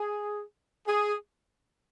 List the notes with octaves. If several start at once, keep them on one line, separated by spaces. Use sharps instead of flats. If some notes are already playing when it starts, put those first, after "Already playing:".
Already playing: G#4
G#4